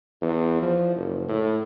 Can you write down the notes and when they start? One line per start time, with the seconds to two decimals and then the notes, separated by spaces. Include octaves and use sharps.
0.22 E2
0.62 F3
0.96 F#1
1.28 A2